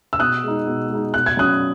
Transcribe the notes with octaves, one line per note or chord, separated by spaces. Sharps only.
E6
B2 D#6 F#6
G#3 D#4
B2
G#3 D#4
B2 F#6
G#6
F#3 C#4 D#6 F#6